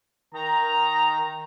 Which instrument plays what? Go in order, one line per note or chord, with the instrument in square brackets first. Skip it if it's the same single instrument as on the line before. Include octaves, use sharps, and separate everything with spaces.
[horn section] D#3 A#4 A#5